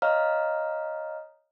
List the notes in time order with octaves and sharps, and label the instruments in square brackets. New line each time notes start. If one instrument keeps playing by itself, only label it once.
[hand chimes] C#5 D#5 F5 A#5 F6